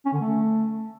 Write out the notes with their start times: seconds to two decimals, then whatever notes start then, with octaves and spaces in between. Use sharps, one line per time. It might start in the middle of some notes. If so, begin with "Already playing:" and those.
0.05 C#4
0.13 D3
0.21 A3